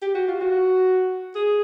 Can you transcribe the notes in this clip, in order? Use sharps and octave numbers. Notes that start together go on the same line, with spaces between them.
G4
F#4
F4
F#4
G#4